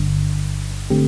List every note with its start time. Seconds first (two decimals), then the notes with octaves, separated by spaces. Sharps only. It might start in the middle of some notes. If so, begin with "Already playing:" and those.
Already playing: G1 G2 D3
0.90 D3 A3 C4 G4